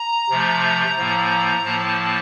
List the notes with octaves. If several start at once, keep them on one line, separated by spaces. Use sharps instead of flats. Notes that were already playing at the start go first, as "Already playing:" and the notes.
Already playing: A#5
C3 F3 A3
A2 F3 A#3
A2 F3 A#3 A5